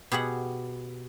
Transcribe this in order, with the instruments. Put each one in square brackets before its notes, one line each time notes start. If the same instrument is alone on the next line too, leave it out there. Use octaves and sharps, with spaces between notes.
[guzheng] B2 G4 G#4 F#5